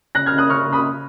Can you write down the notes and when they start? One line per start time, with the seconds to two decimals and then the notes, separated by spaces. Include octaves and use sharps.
0.15 C#3 F#6 A#6
0.26 F6 G#6
0.33 C#3
0.38 D#6 F#6
0.49 C#3 C#6 F6
0.66 C#3
0.73 B5 D#6